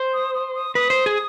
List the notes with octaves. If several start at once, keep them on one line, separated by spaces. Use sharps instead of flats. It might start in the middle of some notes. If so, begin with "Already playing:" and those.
Already playing: C5
D#6
D#6
D#6
B4 D#6
C5
G#4